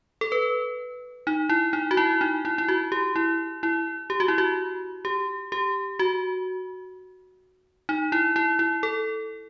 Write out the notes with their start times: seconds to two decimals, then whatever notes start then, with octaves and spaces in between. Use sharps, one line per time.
0.21 A4
0.32 B4
1.27 D#4
1.49 E4
1.73 D#4
1.91 F#4
1.97 E4
2.21 D#4
2.45 E4
2.58 E4
2.68 F#4
2.92 G4
3.16 E4
3.63 E4
4.10 G4
4.20 F#4
4.28 E4
4.38 F#4
5.05 G4
5.52 G4
5.99 F#4
7.89 D#4
8.12 E4
8.36 E4
8.59 E4
8.83 A4